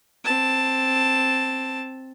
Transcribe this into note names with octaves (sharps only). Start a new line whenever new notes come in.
C4 A5